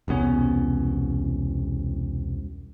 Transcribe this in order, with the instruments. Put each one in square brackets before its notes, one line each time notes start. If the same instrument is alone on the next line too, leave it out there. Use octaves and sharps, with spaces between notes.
[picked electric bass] E1 C2 B3 C#4